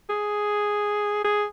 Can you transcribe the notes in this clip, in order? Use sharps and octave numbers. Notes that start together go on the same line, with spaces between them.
G#4
G#4